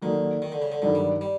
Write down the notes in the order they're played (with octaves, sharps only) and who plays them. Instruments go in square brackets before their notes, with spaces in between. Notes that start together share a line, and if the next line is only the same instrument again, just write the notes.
[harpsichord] D3 [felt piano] D#3 F#3 A#3 D#4 F#4
[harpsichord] D#3
D3
C#3
D3
[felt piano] G2 D#3 F#3 [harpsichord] D3
[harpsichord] G3
G3